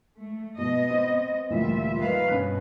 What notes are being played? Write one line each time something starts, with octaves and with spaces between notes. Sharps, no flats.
A3
B2 B3 D#5
C4
D2 A#2 E3 G3 F4 E5
D#3 B4 D#5 F5
G2 B2 C#4 F#6